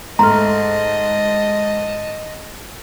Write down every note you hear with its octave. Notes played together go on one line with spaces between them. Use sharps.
G#2 A3 D#5 A5 A#5 C6 F6